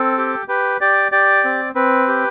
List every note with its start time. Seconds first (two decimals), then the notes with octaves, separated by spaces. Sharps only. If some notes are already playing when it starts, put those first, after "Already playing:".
Already playing: C4 A4
0.18 G4
0.48 G4 B4
0.81 G4 D5
1.12 G4 D5
1.44 C4
1.75 C4 B4
2.08 G4